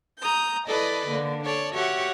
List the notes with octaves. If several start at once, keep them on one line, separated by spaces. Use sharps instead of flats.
A#5 D#6 G6
E4 A4 B4 D5 D#5
D3 A#3
D4 A4 C#5 D5
F#4 G4 C#5 E5 F#5